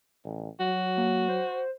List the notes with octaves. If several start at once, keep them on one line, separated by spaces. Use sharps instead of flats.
A1
F#3 F#4
A#3
C5